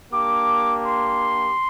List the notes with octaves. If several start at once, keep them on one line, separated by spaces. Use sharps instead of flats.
A#3 D4 G4 D6
C6